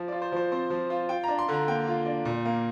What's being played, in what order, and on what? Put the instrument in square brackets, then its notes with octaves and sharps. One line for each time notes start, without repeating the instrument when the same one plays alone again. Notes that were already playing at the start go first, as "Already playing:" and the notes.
Already playing: [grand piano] F3
F4 D5
C5
F3 C5
C4 C5
F3
F4
F4 G5
D4 A#5
C6
D3 A#5
A#3 G5
F4
D4
A#2
A#3